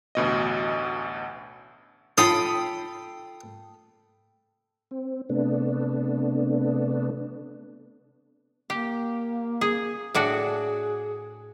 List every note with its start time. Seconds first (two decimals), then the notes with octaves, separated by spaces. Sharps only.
0.15 A1 D2 B2 D#5
2.18 F4 A4 G5 B5 D#6
4.91 C4
5.29 C3 A3 B3 D4
8.70 A#3 G4
9.61 G#4
10.15 A2 D4 F#4 G#4